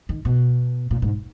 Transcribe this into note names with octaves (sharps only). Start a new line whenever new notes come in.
D#3
B2
A#2
G#2